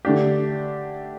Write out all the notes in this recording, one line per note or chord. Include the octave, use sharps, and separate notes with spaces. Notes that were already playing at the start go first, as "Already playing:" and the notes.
D3 A3 D4 G4